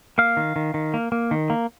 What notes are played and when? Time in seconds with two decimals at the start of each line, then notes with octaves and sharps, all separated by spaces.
0.18 A#3 F5
0.37 D#3
0.56 D#3
0.74 D#3
0.94 A#3
1.12 A#3
1.31 D#3
1.50 A#3